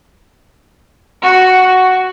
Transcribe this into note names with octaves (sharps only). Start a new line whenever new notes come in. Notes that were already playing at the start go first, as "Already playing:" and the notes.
F#4
F#4